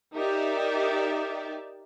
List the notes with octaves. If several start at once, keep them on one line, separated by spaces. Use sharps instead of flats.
D#4 G4 A#4 D5 E5